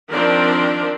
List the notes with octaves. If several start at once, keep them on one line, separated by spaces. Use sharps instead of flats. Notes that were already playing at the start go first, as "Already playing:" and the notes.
D#3 F3 C4 D4 A#4 D5